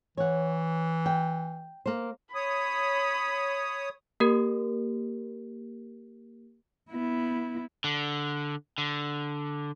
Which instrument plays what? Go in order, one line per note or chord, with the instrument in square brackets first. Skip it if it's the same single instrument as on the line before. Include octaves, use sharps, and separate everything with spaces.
[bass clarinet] E3 [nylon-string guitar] C#5 F#5
[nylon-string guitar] G5
A#3 C5
[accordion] C#5 D#6 [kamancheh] B5
[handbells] A#3 G4 A#4
[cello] B3 E4
[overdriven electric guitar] D3
D3